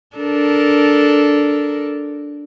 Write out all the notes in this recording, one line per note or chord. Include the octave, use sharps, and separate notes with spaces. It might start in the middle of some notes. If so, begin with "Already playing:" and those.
D4 A4 A#4